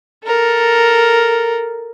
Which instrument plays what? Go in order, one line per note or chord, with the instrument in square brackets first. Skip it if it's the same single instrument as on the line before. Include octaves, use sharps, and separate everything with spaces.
[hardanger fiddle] A4 A#4